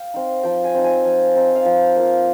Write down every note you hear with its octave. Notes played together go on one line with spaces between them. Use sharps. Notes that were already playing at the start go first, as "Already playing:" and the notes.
Already playing: F5 G5
C4 D#4
F3 G5
G#5
C4 D#4
G#5
F3
C4 D#4
F5
F3 G5
A#3 F4